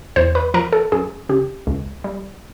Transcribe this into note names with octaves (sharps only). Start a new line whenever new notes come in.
E2 C5
B4
F3 A#4
A4
F#2 G#4
C#3 G4
C#2
G3